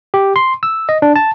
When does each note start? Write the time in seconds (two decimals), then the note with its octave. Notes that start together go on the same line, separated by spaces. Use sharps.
0.14 G4
0.36 C6
0.63 E6
0.89 D#5
1.02 D4
1.16 A5